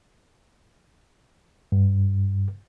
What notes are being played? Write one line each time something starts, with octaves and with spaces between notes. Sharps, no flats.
G2